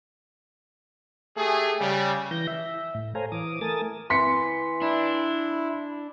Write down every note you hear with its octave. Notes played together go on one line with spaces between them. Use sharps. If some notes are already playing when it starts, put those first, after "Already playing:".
A3 G4 G#4
C#3 G3
E3 G6 A#6
E5
A2
A4 C5 C#5 F5 G#5 A#5
E3 D6 D#6
A3 A#4 G#5 A5 D#6 A6
E3 C6 B6 C#7
D4 E4